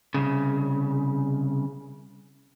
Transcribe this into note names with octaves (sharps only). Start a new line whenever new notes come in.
C2 C#3